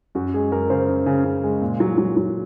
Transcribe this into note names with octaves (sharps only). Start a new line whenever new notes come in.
F#2 F#4
G#3 G#4
F#2 A#4
C#3 C5
F#2
C#3
C#3
G#3
A#2
F#3
F#3
F#3